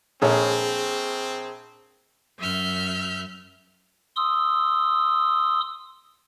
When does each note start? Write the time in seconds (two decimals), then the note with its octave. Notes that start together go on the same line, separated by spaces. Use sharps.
0.22 A#1 C4 G#4 A4 C#5 A#5
2.38 F#2 E5 F6 G6
4.16 C6 D#6 E6